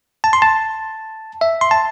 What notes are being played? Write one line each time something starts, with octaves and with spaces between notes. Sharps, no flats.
A5
C6
A5
E5
C6
A5